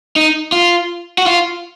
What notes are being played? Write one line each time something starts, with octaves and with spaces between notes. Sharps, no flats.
D#4
F4
F#4
F4